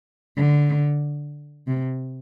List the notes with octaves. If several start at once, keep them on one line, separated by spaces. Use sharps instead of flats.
D3
C3